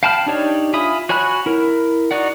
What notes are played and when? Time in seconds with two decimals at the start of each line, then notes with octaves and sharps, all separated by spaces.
0.03 F5 G5 A5 B5 F6
0.26 D4 D#4 G4 C#5 D5
0.73 F4 E5 G#5 B5 D#6
1.09 F#4 C#5 G#5 B5 F#6
1.46 E4 A#4
2.11 D#4 F#4 D5 F#5